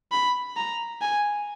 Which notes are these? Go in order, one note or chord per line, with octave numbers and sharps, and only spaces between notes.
B5
A#5
G#5